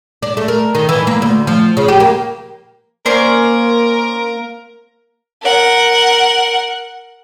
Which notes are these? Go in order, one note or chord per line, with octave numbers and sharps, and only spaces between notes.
D4
A3
A#4
D#3
E3
A#3
D2
F3
C#3
G4
A#3
A#3 C#4 A#4 C5 D5
A#4 F#5